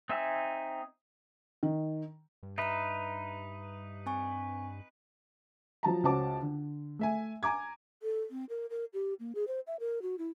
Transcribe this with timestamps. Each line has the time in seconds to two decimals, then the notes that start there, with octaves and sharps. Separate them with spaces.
0.09 C4 D#4 E5 G#5 E6
1.63 D#3
2.43 G2
2.58 D#4 B4 E5 A#5
4.06 C4 G#5 C#6
5.83 F3 F#3 A5 A#5
6.03 C#2 C#4 F#4 C5 A5 D6
6.42 D3
6.99 A3 E5 G#5
7.43 G#5 A#5 D6 G#6
8.03 A4
8.31 C4
8.50 A#4
8.70 A#4
8.94 G4
9.20 A#3
9.35 G#4
9.48 C5
9.67 E5
9.80 A#4
10.02 F#4
10.18 E4